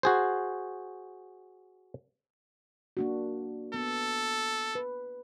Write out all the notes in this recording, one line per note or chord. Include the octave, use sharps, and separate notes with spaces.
F#4 G#4 C5
A#3 D4 F#4
B3 A4
B4